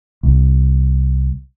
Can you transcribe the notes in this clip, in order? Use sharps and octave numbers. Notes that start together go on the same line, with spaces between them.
C2